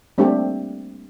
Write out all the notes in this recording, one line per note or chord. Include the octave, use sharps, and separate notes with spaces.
G3 A3 A#3 C4 D4 G4